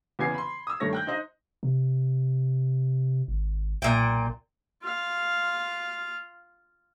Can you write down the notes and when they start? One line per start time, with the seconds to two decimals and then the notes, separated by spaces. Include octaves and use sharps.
0.19 E2 C#3 B3 G#5 G#6 C7
0.34 B5 C6
0.67 D#6 E6
0.80 G2 D#3 A3 C#5 A#6
0.93 G5 F#6 G6
1.07 D#4 C5 D#5
1.63 C3
3.28 G#1
3.82 B1 A#2 G5
4.83 F4 F5